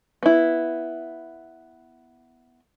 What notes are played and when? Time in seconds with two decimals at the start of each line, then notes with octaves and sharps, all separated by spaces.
0.23 B3 E4